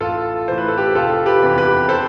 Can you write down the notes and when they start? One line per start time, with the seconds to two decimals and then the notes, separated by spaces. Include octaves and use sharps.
0.01 A1 F4 A4
0.48 A2 E3 C5
0.58 B4
0.68 A4
0.78 G4 B4
0.95 F1 F4 A4
1.26 G4 B4
1.42 E2 C3 E3
1.58 G4 B4
1.89 A4 C5